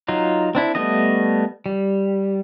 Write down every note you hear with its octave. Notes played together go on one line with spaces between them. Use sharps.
F#3 D#4 F4
C4 D4 E4
G3 A3 B3 D#5
G3